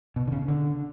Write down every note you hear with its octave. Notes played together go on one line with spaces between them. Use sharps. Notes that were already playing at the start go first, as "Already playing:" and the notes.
B2
D3
C#3
D3